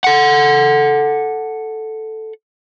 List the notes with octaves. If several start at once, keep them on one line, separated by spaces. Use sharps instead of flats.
A4 F#5